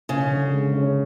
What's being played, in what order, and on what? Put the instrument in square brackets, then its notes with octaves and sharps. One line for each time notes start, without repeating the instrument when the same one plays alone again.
[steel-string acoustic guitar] C#3 [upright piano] C#4
[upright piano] D3
G#3
C#4